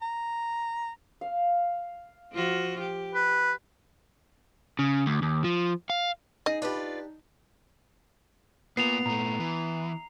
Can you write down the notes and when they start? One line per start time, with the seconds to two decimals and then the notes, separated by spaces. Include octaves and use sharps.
0.02 A#5
1.21 F5
2.32 F3 F4 F#4
2.80 G4
3.15 B4
4.79 C#3
5.06 D2
5.22 D#2
5.44 F3
5.90 F5
6.46 D#4 G#4 D#5
6.62 D4 F4 G4 B4 D5
8.77 A#3 B3 F4 A#5 C7 F7
9.06 A#2 A3 A#5
9.40 E3